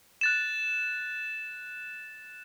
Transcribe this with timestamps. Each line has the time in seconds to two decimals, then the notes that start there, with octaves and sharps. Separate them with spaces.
0.21 F#6 A6 E7